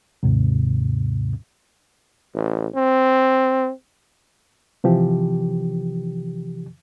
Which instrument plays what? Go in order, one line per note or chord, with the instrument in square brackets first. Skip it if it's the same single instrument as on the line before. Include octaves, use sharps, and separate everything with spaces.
[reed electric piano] D#2 G#2 C3
[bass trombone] A1
C4
[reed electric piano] C3 E3 F3 G4